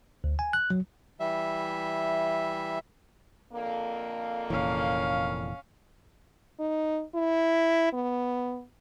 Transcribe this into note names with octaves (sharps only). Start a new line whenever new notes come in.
D2
G#5
F#6
F#3
E3 G3 E5
F2 D3 A#3
F1 A#2 E3 C#4 F5
D#4
E4
B3